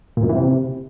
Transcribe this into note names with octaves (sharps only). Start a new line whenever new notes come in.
A#2
F#2
E3
C3